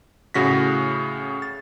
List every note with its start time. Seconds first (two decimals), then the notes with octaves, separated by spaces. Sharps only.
0.34 A2 C#3 F#4 A#6 B6
1.42 A6